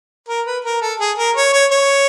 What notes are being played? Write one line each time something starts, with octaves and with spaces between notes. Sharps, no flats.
A#4
B4
A#4
A4
G#4
A#4
C#5
C#5
C#5